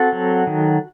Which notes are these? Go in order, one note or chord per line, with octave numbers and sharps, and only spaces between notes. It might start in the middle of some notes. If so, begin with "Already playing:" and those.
Already playing: C4 F#4 A4
F#3
D#3